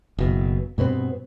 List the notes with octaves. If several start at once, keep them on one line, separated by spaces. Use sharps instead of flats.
F#1 B2
G2 B2 B3 C4